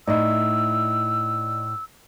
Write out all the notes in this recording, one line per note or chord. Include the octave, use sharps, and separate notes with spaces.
A2 D#4 E4 D5 D#5 E6